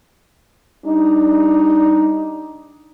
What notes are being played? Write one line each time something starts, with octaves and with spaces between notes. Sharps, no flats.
G3 D4 D#4